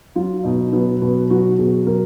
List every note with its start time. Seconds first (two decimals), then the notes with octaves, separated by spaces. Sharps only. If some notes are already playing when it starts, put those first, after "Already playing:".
0.15 F#3 F4
0.44 B2 D#4
0.72 F#3 B3
1.02 B2 B3
1.30 F#3 F#4
1.58 B2 G#4
1.87 F#3 A#4